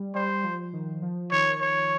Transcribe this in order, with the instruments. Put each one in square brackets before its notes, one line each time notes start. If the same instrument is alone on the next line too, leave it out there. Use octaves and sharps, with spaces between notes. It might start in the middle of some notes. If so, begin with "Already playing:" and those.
Already playing: [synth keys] G3
[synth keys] G3 [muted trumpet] C5
[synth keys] G3
F3
D#3
F3
[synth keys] D#3 [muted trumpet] C#5
[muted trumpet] C#5